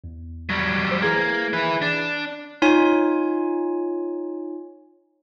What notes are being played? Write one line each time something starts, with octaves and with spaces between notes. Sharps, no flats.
E2
F#3 G3
C5 E6
E3 A#3 G#4 A#4 G#6
E4 B4
D4
D#4 F4 C#5 G#5